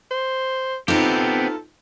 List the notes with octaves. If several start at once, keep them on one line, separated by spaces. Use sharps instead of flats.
C5
B3 C4 D#4 F4 G4 A4